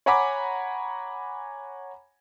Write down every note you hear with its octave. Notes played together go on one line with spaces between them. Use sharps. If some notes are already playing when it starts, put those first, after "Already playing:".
C#5 F#5 G#5 A#5 B5 D6